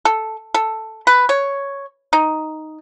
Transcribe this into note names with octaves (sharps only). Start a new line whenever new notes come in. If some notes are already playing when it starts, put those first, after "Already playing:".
A4
A4
B4
C#5
D#4